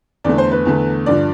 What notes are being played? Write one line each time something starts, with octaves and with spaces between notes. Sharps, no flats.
E2 D3 A3 D5
C5
B4
E2 D3 A3
G2 D3 F3 D5